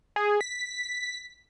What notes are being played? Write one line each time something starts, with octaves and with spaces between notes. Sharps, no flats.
G#4
B6